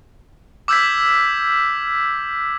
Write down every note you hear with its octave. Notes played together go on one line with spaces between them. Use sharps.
D6 E6 F6 G6 G#6 B6